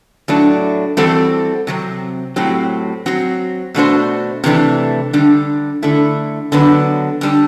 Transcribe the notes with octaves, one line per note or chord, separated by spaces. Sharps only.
A2 F#3 A3 D4
E3 G3 C4 F#4 A4
C3 F#3 C4
A2 F#3 C4 G4
F#3 C4 F#4
B2 A3 D4 F#4 C5
C3 E3 A3 D4 A4
D3 G3 D4
D3 A3 E4
D3 F#3 B3 D4
D3 G3 D4